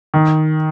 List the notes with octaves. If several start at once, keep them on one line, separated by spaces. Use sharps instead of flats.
D#3